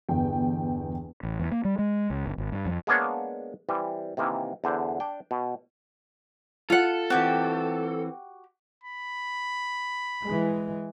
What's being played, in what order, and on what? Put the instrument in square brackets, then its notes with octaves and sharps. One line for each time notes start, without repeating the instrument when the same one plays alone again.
[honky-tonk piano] G1 E2 G5
[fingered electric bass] A1
E2
A#3
G3
G#3
C#2
G1
G#1
G2
F2
[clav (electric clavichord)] G#3 A#3 B3 D4 C#5 F5
E3 G3 C4
C3 D#3 E3 A#3
E2 D3 C5
D4 G5
B2
[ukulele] F4 F#5 [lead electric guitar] A4
[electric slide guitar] E3 C4 [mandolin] F#4 G4
[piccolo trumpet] B5
[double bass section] E3 G#3